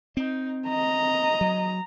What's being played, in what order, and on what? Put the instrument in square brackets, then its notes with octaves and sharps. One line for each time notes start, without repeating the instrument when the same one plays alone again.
[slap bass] C4 [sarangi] D#4
[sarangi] D#5 [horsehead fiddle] A#5
[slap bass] F#3